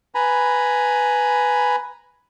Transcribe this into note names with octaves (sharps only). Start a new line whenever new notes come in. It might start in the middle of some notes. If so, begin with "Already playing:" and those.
B4 G#5 A#5 B5